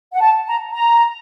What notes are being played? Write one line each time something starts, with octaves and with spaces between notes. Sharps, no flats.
F#5
A5
A#5
A#5